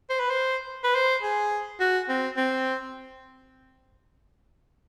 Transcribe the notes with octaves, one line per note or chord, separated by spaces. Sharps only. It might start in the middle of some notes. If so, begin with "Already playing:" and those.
C5
B4
C5
B4
C5
G#4
F#4
C4
C4